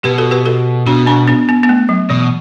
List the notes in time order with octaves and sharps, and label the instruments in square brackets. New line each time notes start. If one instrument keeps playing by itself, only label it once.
[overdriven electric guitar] B2 [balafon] G4 B4
[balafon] F#4 A4
G4 B4
F#4 A4
[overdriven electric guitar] B2 [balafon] D4 F#4
[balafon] B3 D4
B3 D4
B3
B3
A3
F#3
[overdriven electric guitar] B2 [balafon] E3